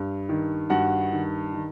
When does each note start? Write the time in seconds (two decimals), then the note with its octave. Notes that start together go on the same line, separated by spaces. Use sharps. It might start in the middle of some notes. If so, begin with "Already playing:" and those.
Already playing: G2
0.29 D#3
0.70 G2 F#4 F#5
1.12 D#3
1.53 D#3